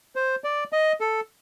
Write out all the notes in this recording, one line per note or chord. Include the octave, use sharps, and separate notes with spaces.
C5
D5
D#5
A4